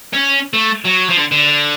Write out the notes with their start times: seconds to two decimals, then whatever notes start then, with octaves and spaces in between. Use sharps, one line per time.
0.13 C#4
0.53 A3
0.85 F#3
1.10 F3
1.17 D3
1.31 D3